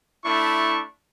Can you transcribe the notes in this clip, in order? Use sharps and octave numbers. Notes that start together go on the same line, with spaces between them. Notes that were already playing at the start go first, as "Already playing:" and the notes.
A3 D4 E4 C#6